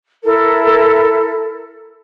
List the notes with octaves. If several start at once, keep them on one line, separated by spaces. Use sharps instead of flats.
E4 A4 A#4